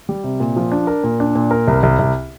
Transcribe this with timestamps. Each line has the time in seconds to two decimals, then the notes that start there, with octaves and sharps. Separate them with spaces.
0.09 G3
0.24 C3
0.40 A#2
0.56 F3
0.72 D4
0.87 A#4
1.04 A#2
1.20 D4
1.35 A#2
1.51 A#4
1.68 C2
1.83 C2
1.99 C2